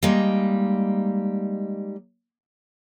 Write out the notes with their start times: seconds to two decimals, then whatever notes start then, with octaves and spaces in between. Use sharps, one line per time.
0.03 G3 G#3 A#3 D#4